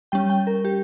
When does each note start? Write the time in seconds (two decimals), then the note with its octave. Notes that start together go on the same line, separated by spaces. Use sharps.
0.12 G3 C#4 G5
0.30 G5
0.47 A#4
0.65 G4